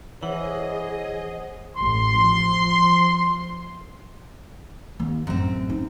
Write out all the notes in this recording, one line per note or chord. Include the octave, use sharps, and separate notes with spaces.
E3 G#4 C5 C#5 D#5 F#5
A1 A2 C6
F3
D#2
A1 F#2 C4
D#4